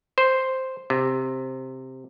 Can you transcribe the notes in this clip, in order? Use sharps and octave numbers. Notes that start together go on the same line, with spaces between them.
C5
C3